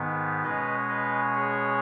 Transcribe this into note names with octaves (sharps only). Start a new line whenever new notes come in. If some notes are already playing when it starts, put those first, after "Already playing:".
Already playing: G#2 D#3 B3
B2 G#3 C#4 B4 D#5
B4 D#5
G#4 C#5